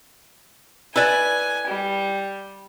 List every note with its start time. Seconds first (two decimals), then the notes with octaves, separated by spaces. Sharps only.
0.96 E4 B4 D5 G#5
1.68 G3